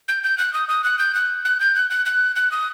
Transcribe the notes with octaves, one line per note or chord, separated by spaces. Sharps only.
G6
G6
F#6
D#6
D#6
F#6
G6
F#6
F#6
G6
F#6
F#6
F#6
F#6
D#6